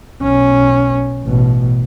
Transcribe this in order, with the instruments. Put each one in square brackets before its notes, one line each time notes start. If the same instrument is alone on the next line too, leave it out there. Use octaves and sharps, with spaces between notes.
[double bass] B1 C#4
A1 B2